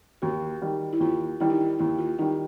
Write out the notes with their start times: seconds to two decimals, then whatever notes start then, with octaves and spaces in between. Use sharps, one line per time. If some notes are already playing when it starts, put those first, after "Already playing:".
0.22 D#2 F#4
0.62 D#3 G3
0.93 E4
1.00 D#2 F4
1.40 D#3 G3 E4
1.50 D#4
1.61 E4
1.79 D#2 E4
1.99 F4
2.19 D#3 G3 D#4